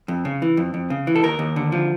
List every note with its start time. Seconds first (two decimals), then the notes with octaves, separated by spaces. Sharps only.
0.08 F2
0.25 C#3
0.42 E3
0.57 F2
0.74 F2
0.90 C#3
1.07 E3
1.16 A4
1.23 D#2 A#4
1.39 D#2
1.56 D3
1.72 F3